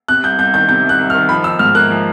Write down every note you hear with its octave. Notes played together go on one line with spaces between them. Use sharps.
C3 F#6
C2 G6
C2 G6
D#3 G6
C3 G6
C2
F#6
C2
F6
D#3
F3 B5
D#4 E6
G#2 F6
A#3 F#6
F3